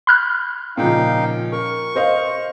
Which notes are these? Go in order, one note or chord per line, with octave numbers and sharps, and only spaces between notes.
B5 F6 F#6
A#2 C#3 F3 D#4 F5 G5
A#4 C#6
C5 D#5 F5